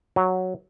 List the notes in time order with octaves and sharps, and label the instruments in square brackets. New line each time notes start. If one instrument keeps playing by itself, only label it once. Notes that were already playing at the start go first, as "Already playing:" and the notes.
[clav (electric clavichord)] F#3